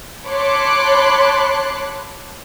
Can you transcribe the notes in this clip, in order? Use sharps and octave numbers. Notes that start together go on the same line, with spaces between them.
C#5 A5 B5 C6 D6 F#6